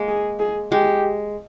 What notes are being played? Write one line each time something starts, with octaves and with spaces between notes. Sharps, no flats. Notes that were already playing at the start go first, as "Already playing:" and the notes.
Already playing: G#3 A#3
G#4
G#4
G#3 G4